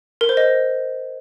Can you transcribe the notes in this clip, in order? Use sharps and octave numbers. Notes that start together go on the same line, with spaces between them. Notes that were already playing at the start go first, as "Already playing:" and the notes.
A#4
C5
D#5